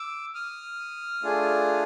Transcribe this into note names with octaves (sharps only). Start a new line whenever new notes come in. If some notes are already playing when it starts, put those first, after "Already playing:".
Already playing: D6 E6
D#6 F6
A3 D4 F4 G#4